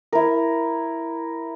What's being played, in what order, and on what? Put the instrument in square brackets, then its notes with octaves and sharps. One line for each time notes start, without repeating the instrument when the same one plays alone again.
[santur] E4 A#4